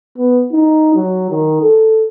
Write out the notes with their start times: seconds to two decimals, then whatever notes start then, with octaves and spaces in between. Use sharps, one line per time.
0.18 B3
0.52 D#4
0.95 F#3
1.30 D#3
1.62 A4